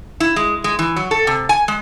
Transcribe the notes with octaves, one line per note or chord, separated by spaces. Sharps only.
E4
G#3
G#3
E3
F#3
A4
C3
G#5
G#3